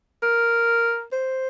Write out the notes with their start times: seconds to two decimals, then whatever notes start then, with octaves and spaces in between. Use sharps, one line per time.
0.23 A#4
1.12 C5